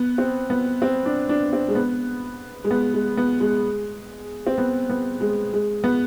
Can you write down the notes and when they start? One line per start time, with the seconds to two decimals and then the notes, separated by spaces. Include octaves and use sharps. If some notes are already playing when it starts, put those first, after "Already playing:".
Already playing: B3
0.18 C4
0.50 B3
0.82 C4
1.05 D4
1.29 D4
1.53 C4
1.68 G#3
1.75 B3
2.64 G#3
2.71 B3
2.94 G#3
3.17 B3
3.40 G#3
4.47 C4
4.58 B3
4.90 B3
5.21 G#3
5.53 G#3
5.84 B3